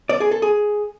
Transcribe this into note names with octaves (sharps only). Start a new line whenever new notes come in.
D5
G#4
A4
G#4